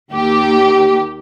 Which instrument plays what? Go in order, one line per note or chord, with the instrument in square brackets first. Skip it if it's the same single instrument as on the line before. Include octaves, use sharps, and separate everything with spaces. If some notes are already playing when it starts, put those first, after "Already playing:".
[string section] D#2 G4